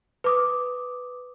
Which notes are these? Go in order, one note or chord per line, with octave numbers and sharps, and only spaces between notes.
B4 D6 D#6